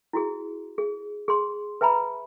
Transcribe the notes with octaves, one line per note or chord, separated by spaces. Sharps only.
E4 F#4 G#4
G#4
G#4 C6
B4 E5 G#5 A#5 B5